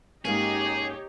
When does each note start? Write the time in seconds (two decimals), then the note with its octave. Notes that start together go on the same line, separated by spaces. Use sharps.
0.25 G#2 A#3 C#4 D#4 G4 G#4 C#5